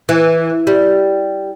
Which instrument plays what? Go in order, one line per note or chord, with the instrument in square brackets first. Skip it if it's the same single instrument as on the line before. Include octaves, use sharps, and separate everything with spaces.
[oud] E3
G3